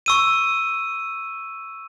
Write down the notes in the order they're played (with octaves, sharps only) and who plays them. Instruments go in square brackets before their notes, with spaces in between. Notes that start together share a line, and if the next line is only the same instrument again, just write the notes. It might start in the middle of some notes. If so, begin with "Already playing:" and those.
[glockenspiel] C#6 E6 D#7